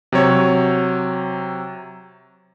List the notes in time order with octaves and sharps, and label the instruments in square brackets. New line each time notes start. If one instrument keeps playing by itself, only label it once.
[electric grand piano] C3 F#3 C#5